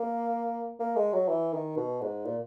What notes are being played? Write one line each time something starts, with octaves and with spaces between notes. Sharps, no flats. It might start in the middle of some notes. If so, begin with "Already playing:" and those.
Already playing: A#3
A#3
G#3
F#3
E3
D#3
B2
G#2
A#2